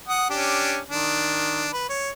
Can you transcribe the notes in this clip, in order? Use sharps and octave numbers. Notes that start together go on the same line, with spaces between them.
F#5 D#6
C#4 D4 G4
D#3 D4
B4
C#5